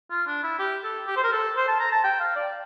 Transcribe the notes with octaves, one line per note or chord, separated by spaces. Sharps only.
F4
D4
E4
G4
A4
G4
C5
A#4
A4
C5
A5
A#5
A5
G5
F5
D5